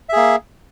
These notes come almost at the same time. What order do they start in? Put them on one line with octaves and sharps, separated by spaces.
E5 G#4 A#3